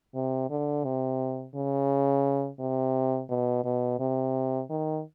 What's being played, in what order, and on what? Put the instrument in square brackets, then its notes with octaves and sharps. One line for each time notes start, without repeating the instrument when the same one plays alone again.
[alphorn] C3
D3
C3
C#3
C3
B2
B2
C3
D#3